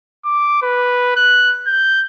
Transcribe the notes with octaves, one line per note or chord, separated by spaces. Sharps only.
D6
B4
F#6
G6